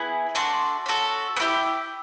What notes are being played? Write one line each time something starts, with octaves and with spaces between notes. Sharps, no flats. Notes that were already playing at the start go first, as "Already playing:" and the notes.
Already playing: B3 E4 G#4
A3 D4 F#4 C6
C#4 F#4 A4
B3
E4 G4